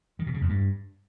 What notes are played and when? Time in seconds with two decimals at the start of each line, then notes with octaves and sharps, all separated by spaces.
0.19 D#3
0.27 B2
0.34 C#3
0.41 F2
0.49 G2